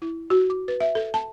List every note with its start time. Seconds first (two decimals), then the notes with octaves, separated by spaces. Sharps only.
0.02 E4
0.30 F#4
0.50 D6
0.68 B4
0.80 E5
0.95 A4
1.14 A5